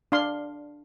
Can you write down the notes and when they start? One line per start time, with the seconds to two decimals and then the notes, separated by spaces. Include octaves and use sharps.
0.12 D4 F5 C6